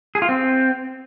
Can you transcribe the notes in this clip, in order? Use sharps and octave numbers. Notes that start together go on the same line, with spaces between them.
G#4
F4
C4